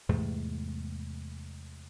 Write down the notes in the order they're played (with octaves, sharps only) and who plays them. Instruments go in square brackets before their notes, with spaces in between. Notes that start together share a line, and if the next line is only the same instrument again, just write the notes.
[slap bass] E2 G#2 C3 A3